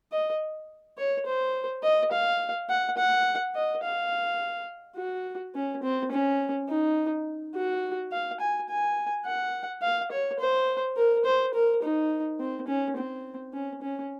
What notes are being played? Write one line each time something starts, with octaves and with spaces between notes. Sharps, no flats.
D#5
C#5
C5
D#5
F5
F#5
F#5
D#5
F5
F#4
C#4
C4
C#4
D#4
F#4
F5
G#5
G#5
F#5
F5
C#5
C5
A#4
C5
A#4
D#4
C4
C#4
C4
C#4
C#4